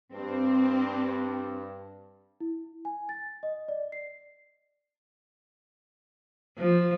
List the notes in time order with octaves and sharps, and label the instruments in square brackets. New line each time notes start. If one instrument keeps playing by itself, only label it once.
[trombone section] G2 [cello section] C4
[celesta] E4
G#5
A6
D#5
D5
C7
[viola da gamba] F3